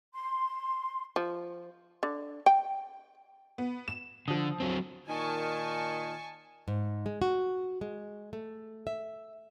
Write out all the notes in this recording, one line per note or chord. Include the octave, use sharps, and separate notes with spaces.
C6
F3
D3
G5
B3
E7
D3 F3 D#6
F#3 C4
A#2 D#3 G#5 A5 C#6
G#2
G#3
F#4
G#3
A3
E5